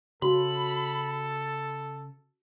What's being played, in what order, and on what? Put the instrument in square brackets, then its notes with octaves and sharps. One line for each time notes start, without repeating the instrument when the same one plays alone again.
[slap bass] C#3 [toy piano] F#4 [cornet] A4 [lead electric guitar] B5